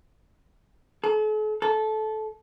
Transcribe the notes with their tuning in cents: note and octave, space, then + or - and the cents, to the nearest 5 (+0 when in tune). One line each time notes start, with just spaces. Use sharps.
A4 -45
A4 -20